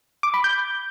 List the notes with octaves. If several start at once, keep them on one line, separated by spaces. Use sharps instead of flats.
D6
B5
G6